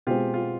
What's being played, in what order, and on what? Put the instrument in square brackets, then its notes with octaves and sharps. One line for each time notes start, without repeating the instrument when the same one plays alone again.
[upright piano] B2 G#3 C4 [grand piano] F4 G4
[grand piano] F4